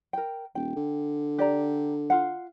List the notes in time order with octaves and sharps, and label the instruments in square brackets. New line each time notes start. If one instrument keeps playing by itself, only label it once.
[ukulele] A#4 G5
[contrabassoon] D#1 [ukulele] G5
[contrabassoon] D3
[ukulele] G4 D5 A#5
F4 F5 F#5